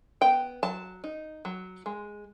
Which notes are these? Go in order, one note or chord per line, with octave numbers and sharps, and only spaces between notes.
B3 G5
F#3 A5
D#4
F#3
G#3